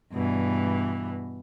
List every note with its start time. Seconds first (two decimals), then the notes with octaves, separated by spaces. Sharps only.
0.11 G2 B2 E3